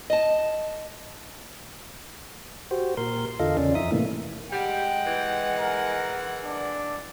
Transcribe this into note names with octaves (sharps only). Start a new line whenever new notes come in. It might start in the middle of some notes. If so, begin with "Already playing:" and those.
D#5 A5
F#4 G4 C5
A#2 A#4 C6
E2 D3 F4 A4 D#5 F5
E2 C#3 C#4 D5
F2 D#4 E5 D#6
A2 C3 E3 A3 A#3
G3 G#3 F#5 G5
E3
A#4
D4